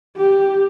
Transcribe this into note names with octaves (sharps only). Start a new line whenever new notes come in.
G4